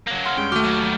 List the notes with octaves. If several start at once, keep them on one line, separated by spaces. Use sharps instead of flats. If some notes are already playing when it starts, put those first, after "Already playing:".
F#3 A#3
F#5 C6 F6
G2 G#3 C#4 G5
D#2 A3 F#4 D6 F6
F#3 G3